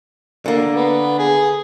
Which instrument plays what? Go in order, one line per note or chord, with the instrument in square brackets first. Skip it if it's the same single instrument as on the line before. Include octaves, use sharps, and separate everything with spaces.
[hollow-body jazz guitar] D3 A#3
[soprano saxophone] B3
G#4